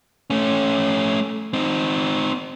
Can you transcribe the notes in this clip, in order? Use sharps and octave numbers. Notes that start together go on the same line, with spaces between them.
A3 C#4
C4 D#4